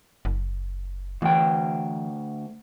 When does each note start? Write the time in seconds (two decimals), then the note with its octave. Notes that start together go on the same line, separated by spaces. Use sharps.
0.25 F#1
1.22 D2 E3 G5